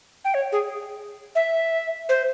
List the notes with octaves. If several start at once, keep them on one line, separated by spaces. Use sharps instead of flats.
G5
C#5
G#4
E5
C5